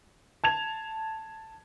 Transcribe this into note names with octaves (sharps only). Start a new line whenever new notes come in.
A5 G#6 F7